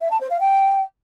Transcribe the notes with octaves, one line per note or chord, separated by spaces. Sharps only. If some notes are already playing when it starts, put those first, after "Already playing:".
E5
A5
C5
F5
G5